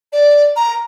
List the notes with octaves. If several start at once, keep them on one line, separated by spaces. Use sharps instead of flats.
D5
A#5